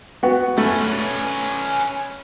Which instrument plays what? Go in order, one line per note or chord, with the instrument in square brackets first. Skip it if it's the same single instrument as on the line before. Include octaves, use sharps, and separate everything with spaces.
[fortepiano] B3 F#4
[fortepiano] A3 [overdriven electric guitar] C#4 B4